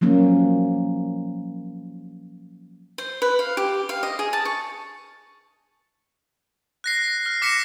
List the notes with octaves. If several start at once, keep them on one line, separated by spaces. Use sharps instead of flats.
F3 F#3 A#3 C#4
C5
B4
F5
G4
F5
D#5
G#4
A5
C#6
F#6 A#6 C7
F6
D6 A#6 B6 C#7 E7